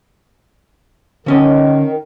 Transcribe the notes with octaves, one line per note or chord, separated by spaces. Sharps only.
D3 D#3 C#4 D#5